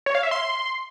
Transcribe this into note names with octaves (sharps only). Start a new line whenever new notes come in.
C#5
F5
E5
C6